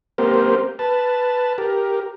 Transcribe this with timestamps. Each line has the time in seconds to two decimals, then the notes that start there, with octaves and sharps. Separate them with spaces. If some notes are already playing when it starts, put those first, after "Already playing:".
0.18 A#3 C4 G4 A#4 C5
0.79 B4 A5
1.58 G4 A#4